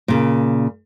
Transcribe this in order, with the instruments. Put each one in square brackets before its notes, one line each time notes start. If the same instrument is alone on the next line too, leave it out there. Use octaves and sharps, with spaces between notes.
[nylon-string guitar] A#2 C#3